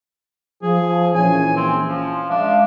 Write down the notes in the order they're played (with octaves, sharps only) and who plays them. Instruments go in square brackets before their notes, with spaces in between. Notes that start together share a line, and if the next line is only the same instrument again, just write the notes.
[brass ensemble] F3 [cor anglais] G#4
[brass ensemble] A#1 E3 C#4 [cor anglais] G#5
[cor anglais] C4
F3
[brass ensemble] G#3 E5 F5 [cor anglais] D4